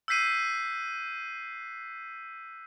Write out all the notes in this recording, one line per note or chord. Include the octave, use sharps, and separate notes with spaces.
E6 F#6 G6 B6 C7 D#7